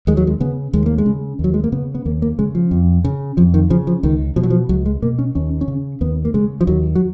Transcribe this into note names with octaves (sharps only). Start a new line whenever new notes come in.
D#2 G#3
F#3
G#3
C#3 B3
D#2 G#3
A#3
G#3
C#3
D#2
F#3
G#3
A#3
C#3 B3
B3
D#2 A#3
A#3
C#3 G#3
F3
F2
C#3
F2 F3
D#3
C#3 F3
F3
C#2 D#3
B2 F3
F#3
F3
C#2 F#3
G#3
B2 A#3
C#4
D#2 C#4
C#4
C#3
D#2 B3
A#3
C#3 G#3
F3
D#2 F#3
F#3